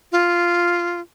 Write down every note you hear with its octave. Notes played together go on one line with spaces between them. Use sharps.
F4